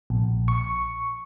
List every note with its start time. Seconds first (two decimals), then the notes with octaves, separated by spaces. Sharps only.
0.10 A#1
0.48 C#6